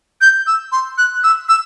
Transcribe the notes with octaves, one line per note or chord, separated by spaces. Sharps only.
G6
E6
C6
F#6
E6
E6